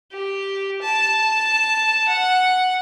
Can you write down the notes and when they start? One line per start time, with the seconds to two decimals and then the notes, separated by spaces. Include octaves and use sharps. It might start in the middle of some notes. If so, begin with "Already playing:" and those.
0.12 G4
0.82 A5
2.08 F#5